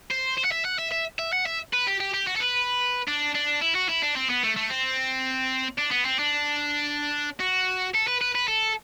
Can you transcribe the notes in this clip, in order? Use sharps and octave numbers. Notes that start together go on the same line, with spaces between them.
C5
C5
F#5
E5
F#5
E5
E5
E5
F#5
E5
B4
G4
G4
G4
F#4
A4
B4
D4
D4
E4
F#4
E4
D4
C4
B3
A3
A3
C4
D4
B3
C4
D4
F#4
A4
B4
B4
B4
A4